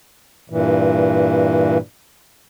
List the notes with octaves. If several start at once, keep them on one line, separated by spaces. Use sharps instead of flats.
G2 A#2 E3